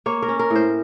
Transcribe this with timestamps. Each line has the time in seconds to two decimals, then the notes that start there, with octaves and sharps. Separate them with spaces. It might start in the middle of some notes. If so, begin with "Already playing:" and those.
0.06 A#3 C#5
0.22 A#4
0.29 C#4
0.39 A#4
0.50 A2
0.55 C5